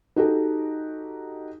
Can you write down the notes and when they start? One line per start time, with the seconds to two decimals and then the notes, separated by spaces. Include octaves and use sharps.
0.16 D#4 F#4 G4 A4